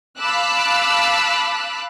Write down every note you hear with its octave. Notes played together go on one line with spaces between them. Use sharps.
F5 A5 B5 D6 E6 F#6